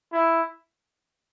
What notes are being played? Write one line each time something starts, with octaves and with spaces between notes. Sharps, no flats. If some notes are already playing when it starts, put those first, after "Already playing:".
E4